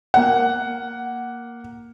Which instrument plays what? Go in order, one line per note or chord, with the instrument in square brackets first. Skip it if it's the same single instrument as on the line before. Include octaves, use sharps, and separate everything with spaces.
[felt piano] A#3 F#5